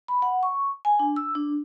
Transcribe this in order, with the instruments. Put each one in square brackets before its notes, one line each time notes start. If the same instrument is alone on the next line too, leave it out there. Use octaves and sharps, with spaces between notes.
[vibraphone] B5
F#5
C#6
G#5
D4
E6
D4